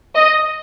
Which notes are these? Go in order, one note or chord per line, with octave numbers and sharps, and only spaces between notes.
D#5